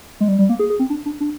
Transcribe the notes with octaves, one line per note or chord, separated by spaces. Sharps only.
G#3
G3
G3
A#3
G#4
G#4
C4
D4
D4
D4